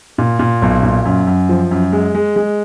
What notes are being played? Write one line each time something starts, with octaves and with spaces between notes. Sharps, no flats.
A#2
A#2
B1
A#2
F#2
F#2
F3
F#2
G#3
G#3
G#3